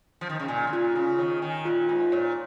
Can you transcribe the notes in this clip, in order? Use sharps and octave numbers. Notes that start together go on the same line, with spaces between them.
F3
D#3
C#3
A#2 G#5
C#3
A#2 F4
C#3 F4
D#3 C#5
D#3 G#5
A#2 F4
G#2 F4
A#2 C#5